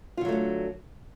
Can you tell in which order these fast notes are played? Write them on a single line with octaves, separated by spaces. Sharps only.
F4 D3 F#3 A3 D4